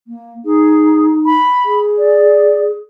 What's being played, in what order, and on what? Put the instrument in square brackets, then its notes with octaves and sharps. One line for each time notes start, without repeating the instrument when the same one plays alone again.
[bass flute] A#3
[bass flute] D#4 [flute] G#4
[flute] B5
[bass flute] G#4
[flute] D5